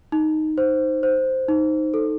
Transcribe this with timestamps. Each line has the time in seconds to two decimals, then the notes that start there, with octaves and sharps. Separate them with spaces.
0.12 D#4
0.58 C5
1.03 C5
1.49 D#4
1.94 A4